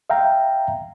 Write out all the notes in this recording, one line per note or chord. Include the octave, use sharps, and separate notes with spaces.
E5 F5 G5 A#5